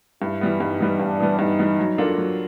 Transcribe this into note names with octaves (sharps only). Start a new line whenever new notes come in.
G2 E4
E3 G3 B3
G2 D#4
E3 G3 B3
G2 D4
E3 G3 B3
G2 D#4
E3 G3 B3
F#3
A#3 D4 F4 A4
F#3